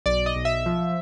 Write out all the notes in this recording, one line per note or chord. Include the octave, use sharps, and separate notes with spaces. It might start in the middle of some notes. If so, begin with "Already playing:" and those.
B1 D5
D#5
B1
E5
F3